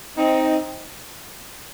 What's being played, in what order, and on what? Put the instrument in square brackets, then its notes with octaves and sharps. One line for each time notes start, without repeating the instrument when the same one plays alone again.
[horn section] C4 D#4